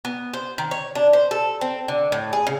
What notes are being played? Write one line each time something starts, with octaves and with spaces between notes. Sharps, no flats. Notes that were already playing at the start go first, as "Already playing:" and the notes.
B3
C5
D#3
C#5
D4
C5
A4
C4
D3
A2
G#4
C#3